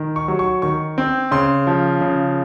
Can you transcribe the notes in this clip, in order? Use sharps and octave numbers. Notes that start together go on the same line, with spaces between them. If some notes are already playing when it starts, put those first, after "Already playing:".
Already playing: D#3
C#6
F#3
C#6
D#3 C#6
C4
C#3 C6
F3
C#3